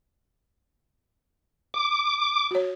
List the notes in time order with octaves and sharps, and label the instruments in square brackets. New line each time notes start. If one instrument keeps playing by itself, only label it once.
[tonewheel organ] D6
[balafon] F#4 C#5